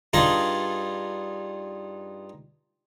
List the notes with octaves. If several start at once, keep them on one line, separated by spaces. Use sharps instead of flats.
G2 D#4 F4 G#4 D#5 A5